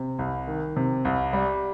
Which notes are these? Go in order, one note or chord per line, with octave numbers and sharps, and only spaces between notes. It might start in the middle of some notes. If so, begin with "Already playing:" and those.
Already playing: C3
C2
D#3
C3
C2
G3